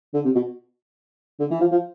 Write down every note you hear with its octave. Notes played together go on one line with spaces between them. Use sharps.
D3
C3
B2
D3
E3
F3
F3